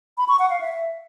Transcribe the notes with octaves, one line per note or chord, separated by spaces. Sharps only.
B5
C#6
F#5
F5
E5